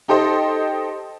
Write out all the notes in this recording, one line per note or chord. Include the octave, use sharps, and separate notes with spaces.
D#4 G4 A4 C5 D#5 C6